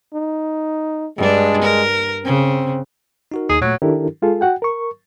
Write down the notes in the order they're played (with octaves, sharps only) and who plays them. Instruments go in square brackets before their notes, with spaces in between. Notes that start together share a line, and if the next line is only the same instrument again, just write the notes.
[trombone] D#4
[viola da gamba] G2 D4 [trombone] G#3
[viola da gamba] A#4
[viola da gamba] C#3 [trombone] C4
[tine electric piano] D#4 F#4 A#4
[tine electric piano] D#2 D#4 [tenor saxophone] G#4
[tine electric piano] A#2 A3 [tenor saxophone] F#3
[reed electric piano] D#3 D4 E4 G4 A4 A#4
G#3 F4 G#4 A4
F#4 F#5 G5
A#4 C#6